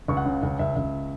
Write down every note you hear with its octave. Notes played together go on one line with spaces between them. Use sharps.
C#2 C#6
F#5
C#3
C#2
C#2 E5
C#2